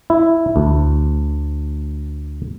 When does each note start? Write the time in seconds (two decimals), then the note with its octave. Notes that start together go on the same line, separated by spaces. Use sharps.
0.10 E4
0.56 D2